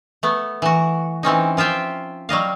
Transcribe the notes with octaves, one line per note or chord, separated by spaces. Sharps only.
A3 B3
E3 F#4
E3 C4 C#4 D#4
F3 F4 E5 G5 G#5
F#3 G3 D#5 F5